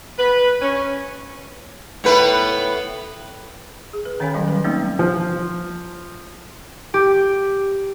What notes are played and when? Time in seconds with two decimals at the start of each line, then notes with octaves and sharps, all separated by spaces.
0.18 B4
0.61 C#4
2.04 A2 B3 B4
3.93 G#4
4.05 B4
4.20 D#3 C#4 C#5 F5 G#5 B5
4.34 F#3 G3 F5
4.48 B4
4.64 G3 A3 A#3 C4 C#4 D#4
4.99 F3
6.94 G4